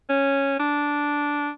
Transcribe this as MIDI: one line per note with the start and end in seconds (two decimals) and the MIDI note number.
0.10 0.59 61
0.60 1.50 62